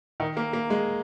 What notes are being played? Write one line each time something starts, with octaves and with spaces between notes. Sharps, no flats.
D#3
A#3
A#3
G#3